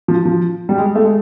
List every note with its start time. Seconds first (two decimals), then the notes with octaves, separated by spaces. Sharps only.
0.08 F3
0.25 F3
0.69 G3
0.78 G#3
0.95 A3
1.04 G#3